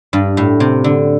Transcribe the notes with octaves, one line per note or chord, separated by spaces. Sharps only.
G2
A2
C3
D3